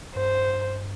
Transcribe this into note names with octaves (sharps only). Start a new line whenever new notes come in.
G2 C5